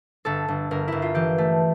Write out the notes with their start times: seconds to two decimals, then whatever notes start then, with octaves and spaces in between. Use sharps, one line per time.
0.25 G1 A4
0.48 G1
0.71 G1 A#4
0.88 G1 E4
1.02 F4
1.15 E3 G4
1.38 A3